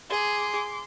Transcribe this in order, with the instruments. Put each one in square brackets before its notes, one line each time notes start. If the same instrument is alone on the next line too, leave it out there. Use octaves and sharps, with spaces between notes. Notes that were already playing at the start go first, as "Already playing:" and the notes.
[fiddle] G#4 [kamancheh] C6 D6